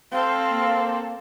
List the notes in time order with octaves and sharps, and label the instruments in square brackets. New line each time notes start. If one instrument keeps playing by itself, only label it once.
[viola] C4 A4 [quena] F5
[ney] A#3